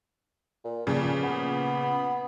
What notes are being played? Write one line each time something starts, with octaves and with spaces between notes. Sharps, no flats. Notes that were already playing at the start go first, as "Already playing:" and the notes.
A#2
G2 A#2 C#3 F3
B3